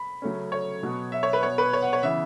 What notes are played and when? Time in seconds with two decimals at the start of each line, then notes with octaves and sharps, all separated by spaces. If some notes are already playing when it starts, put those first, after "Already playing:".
Already playing: B5
0.22 C#3 F#3 A3 C#4
0.52 C#5
0.83 B2 F#3 B3
1.12 E5
1.23 C#5
1.33 B4
1.43 B2 B3 C#5
1.58 B4
1.73 C#5
1.82 F#5
1.93 C#5
2.02 C#3 E3 B3 E5